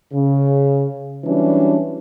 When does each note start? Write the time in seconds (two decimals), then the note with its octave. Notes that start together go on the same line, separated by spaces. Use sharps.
0.13 C#3
1.24 E3 F#3 G3 C#4 D4